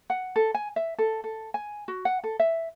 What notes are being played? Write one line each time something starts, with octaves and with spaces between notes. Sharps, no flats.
F#5
A4
G#5
E5
A4
A4
G#5
F#4
F#5
A4
E5